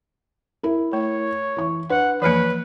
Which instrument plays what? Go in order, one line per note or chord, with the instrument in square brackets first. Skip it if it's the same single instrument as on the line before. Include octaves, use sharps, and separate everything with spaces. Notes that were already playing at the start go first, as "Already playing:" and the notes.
[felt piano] E4 A#4
[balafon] A3 [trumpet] C#5
[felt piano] E3 C#6
[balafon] D4 [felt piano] B4 [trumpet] F#5
[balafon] E3 F3 A#3 [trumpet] B4 [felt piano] C#5 C#7